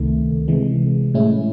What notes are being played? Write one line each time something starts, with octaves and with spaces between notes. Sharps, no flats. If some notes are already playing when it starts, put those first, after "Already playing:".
Already playing: C#2 C3 D#3 A3
C3 E3 G#3
A2 G#3 C#4 E4